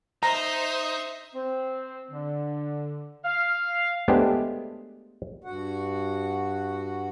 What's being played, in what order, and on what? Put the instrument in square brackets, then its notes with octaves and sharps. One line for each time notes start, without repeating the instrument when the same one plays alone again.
[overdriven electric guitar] D#4 [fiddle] C5 E5 [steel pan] A#5
[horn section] C4
D3
F5
[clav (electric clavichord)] G#3 A3 B3 D4 G4 C5
[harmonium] G2 F#4 F#5